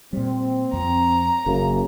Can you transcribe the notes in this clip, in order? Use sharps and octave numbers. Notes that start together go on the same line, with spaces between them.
A#2 G3 C4
F2 F3 A#5
F#1 F#2 C#3 A#3